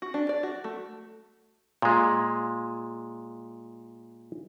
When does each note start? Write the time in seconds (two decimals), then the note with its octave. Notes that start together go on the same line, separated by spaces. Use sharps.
0.02 F#4
0.14 D4
0.29 D5
0.43 F#4
0.64 A3
1.82 A#2 G#3